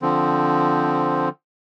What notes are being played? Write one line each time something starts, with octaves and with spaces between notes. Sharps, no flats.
D3 F3 C4